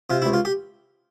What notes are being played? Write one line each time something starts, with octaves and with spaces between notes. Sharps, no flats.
C3 F4
E4
C#2
F4
G4